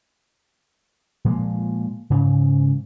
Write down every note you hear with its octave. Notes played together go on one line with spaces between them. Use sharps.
A#2 F3 G#3 A#3
G#2 C#3 E3